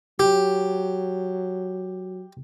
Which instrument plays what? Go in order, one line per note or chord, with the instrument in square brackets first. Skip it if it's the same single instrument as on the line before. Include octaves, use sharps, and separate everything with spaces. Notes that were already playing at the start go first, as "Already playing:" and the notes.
[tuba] F#3 [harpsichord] G4